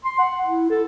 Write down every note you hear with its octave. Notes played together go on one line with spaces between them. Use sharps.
C6
F#5
E4
A4